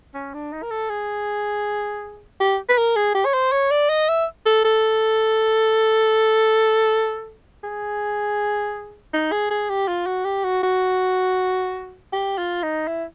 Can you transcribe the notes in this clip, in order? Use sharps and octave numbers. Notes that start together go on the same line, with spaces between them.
C#4
D4
D#4
A#4
A4
G#4
G4
B4
A#4
G#4
G4
C#5
C5
C#5
D5
D#5
E5
A4
A4
G#4
D#4
G#4
G#4
G4
F4
F#4
G4
F#4
F#4
G4
F4
D#4
E4